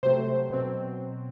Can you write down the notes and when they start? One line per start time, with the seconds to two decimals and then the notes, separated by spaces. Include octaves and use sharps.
0.03 C3 F#3 A3 C4 C5
0.50 B2 F#3 C4